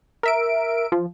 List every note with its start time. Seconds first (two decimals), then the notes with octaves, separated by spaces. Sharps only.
0.23 A#4 E5 D7
0.92 F3